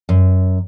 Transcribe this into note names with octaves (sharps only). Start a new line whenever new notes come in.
F#2